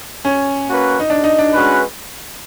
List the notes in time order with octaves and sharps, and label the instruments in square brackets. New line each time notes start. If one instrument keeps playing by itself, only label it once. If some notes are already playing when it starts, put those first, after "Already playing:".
[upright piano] C#4
[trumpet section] A#3 C#4 F#4 B4
[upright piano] D#4
D4
D#4
D4
[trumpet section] G#3 C#4 F#4 B4